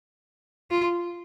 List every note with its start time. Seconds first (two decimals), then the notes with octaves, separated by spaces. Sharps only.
0.71 F4